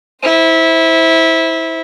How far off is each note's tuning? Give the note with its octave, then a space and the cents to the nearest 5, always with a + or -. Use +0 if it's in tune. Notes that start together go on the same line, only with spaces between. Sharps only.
E4 -15 C5 +0